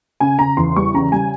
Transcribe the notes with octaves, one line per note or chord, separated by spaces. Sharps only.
C#3 G#5
C#3 A#5
E2 C6
G3 C#6
C#3 A#5
G3 G#5